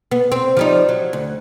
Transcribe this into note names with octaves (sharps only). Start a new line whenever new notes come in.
B3
C4
F3 G3 D#4
F#3
D2